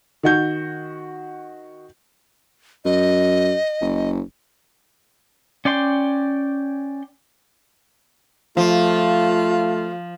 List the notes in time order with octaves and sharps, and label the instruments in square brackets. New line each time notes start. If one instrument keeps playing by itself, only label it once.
[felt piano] D#3 F#4 G6
[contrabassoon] F#2 [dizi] D#5
[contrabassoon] F#1
[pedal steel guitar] C#4 D5 G5 C6
[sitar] F3 [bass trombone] A3 [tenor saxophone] F4